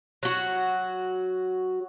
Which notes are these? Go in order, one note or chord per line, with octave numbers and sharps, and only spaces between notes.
F#3 F#4